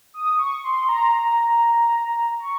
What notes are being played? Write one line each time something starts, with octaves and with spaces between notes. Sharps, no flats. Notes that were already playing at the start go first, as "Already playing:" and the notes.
D#6
C#6
C6
A#5
C#6